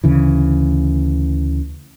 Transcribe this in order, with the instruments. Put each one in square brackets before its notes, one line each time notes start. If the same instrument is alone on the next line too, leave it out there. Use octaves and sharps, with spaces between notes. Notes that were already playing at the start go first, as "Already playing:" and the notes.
[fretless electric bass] D2 C#3 E3